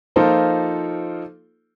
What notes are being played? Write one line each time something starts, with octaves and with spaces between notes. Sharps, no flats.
F3 A#3 D#4 F4 A4 C5